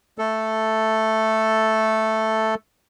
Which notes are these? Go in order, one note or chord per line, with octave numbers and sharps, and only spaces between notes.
A3 A4